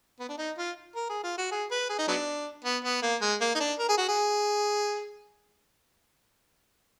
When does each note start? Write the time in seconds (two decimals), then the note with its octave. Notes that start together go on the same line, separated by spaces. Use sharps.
0.20 B3
0.29 D4
0.38 D#4
0.58 F4
0.95 A#4
1.10 G#4
1.23 F4
1.38 F#4
1.51 G#4
1.71 B4
1.89 G#4
1.99 D#4
2.08 F#3 B3 D4
2.64 B3
2.85 B3
3.02 A#3
3.21 G#3
3.41 A#3
3.55 D#4
3.60 D4
3.79 A#4
3.89 G#4
3.98 F#4
4.09 G#4